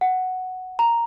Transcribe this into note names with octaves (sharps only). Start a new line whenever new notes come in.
F#5
A#5